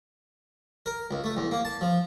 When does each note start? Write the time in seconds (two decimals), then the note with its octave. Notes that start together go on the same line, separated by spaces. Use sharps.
0.86 A#4
1.11 C#2
1.24 A3
1.37 E2
1.51 A#3
1.65 A5
1.81 F3